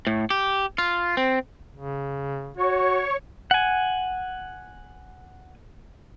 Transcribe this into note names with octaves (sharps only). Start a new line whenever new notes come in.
A2
G4
F4
C4
C#3
F#4 C#5 C#6
F#5 G#5